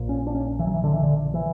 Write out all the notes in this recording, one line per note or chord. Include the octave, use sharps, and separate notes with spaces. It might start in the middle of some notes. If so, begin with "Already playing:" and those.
Already playing: A#1 A#2
C#4
D4
C#4
E3
F#3
E3
D3
E3
D3
E3